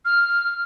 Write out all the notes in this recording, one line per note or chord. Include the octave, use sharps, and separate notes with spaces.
F6